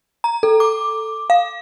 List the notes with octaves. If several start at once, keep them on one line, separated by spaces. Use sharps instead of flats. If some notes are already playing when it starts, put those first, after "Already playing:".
A#5
A4
D6
F5